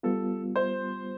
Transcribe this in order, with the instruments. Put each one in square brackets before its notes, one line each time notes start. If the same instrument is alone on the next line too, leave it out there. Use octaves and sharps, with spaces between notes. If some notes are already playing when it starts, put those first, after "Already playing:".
[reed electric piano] G3 B3 F4 [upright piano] A4
[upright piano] C5